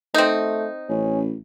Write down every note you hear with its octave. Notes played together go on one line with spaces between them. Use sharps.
A3 C4 D#4
A1 C#4